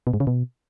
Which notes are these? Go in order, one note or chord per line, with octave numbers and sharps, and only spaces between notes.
B2
G#2
C#3
B2